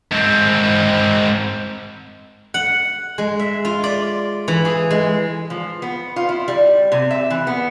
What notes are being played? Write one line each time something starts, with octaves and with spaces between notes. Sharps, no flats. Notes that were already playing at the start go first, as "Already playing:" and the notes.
G#2 C4
F#5
G#3
E5
F4
D5
E3
G#4
G#3
F3
B3
F4
E4
G3
C3
E5
E3
B3